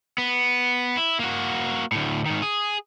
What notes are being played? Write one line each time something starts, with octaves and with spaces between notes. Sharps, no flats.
B3
E4
A#3 F#4
D2 A2
G#2 D#3
G#4